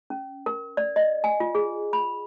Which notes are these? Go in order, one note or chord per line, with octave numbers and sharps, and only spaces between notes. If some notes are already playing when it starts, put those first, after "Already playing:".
C#4
A#4
D5
D#5
G#5
F4
G#4
B5